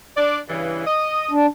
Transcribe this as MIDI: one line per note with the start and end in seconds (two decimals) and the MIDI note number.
0.17 0.38 62
0.17 0.38 74
0.49 0.83 43
0.49 0.83 49
0.49 0.83 52
0.86 1.31 75
1.31 1.46 62